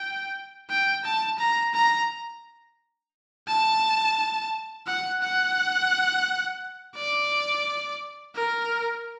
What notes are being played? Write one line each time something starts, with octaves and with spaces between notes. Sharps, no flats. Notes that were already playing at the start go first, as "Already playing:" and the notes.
Already playing: G5
G5
A5
A#5
A#5
A5
F#5
F#5
D5
A#4